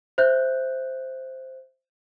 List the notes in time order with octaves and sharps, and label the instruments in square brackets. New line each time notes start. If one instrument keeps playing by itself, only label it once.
[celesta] C5 E5 F#6 G6